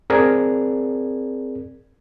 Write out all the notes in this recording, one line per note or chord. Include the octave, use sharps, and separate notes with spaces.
C4 G#4 A#4 D5